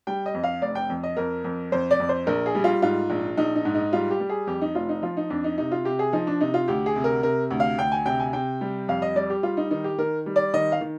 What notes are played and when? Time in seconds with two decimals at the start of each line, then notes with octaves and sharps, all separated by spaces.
0.07 G3 G5
0.26 D#5
0.34 F2
0.43 F5
0.62 F1 D5
0.75 G5
0.90 F2
1.03 D#5
1.17 F2 A#4
1.44 F2
1.72 F2 C5
1.91 D5
2.00 F2
2.09 C5
2.27 A#1 A#4
2.46 G#4
2.55 G3
2.64 F4
2.82 G#2 F4
3.10 A#1
3.37 A#1 D#4
3.56 D#4
3.65 G#2
3.74 D#4
3.93 G3 F4
4.11 G4
4.20 G3
4.29 G#4
4.47 F2 G4
4.61 D#4
4.75 F1 F4
4.89 D#4
5.03 F3 F4
5.17 D#4
5.30 F2 D4
5.44 D#4
5.58 C3 D#4
5.72 F4
5.85 C3 G4
5.99 G#4
6.13 F3 D#4
6.27 D4
6.41 C3 D#4
6.54 F4
6.68 D2 G4
6.86 G#4
6.96 C3
7.04 A#4
7.23 C3 A#4
7.50 D2
7.60 F5
7.78 D2 G5
7.92 G#5
8.06 C3 G5
8.20 G#5
8.33 C3 G5
8.61 G3
8.88 F2 F5
9.02 D#5
9.16 G3 D5
9.30 G4
9.43 G3 F4
9.57 D#4
9.71 D#3 D#4
9.84 G4
9.98 D#3 A#4
10.26 G3
10.36 D5
10.54 D#3 D#5
10.72 F5
10.81 D#3